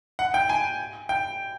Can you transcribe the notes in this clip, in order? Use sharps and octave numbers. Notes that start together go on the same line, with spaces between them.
F#5
G5
G#5
G5